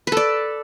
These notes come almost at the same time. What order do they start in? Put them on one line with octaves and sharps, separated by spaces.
B4 A4 D5